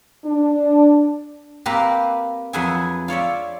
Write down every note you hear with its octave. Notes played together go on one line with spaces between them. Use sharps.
D4
A#3 C4 G4 A#4 B4
F2 F#3 G#4 B4 E5 G#5
F4 C#5 D5 E5